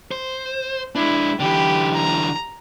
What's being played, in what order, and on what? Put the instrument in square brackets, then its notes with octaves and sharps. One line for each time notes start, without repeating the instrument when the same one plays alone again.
[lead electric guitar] C5
[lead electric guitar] G#3 D4 [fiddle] E4
[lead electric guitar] D3 E3 [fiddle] G4 B5
[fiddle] A#5